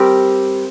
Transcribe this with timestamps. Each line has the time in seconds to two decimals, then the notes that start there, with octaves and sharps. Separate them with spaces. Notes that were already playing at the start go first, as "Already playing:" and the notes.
Already playing: G3 C4 G4 A#4